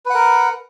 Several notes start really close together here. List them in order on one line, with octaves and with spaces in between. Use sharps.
B4 F#5 A#4